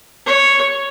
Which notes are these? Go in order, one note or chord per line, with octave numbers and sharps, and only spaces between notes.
C#5